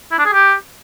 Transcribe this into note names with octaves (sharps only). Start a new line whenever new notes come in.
E4
D4
G#4
G4